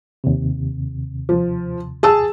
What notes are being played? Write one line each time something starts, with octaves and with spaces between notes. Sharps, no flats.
D#2 C3
F3
G#4 A5 E6